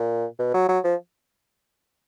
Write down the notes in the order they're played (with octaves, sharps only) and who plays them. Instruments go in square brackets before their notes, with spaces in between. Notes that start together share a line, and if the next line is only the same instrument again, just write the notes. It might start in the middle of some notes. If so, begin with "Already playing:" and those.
Already playing: [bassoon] A#2
B2
F#3
F#3
F3